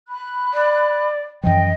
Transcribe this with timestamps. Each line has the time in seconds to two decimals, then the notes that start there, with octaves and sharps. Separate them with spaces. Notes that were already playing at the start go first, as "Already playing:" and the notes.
0.08 B5 F#6
0.53 D5
1.43 F#2 E3 F3 D#5 G5